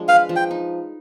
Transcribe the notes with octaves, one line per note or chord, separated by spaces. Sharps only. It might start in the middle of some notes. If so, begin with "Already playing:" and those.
Already playing: F3 G#3 D4
B4 F5
F3
G5
D#4